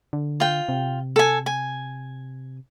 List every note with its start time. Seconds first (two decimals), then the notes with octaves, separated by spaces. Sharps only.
0.13 D3
0.40 F4 G5
0.69 C3
1.16 A4 G#5
1.46 G#5